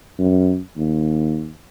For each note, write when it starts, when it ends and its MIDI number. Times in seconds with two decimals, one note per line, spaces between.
0.18 0.59 42
0.77 1.51 39